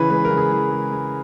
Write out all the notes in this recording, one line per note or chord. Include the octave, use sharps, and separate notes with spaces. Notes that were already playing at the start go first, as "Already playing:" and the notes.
Already playing: C#3 E3 B4
G#3 B4
A#4
C#3
G#4
E3
G#3
G#3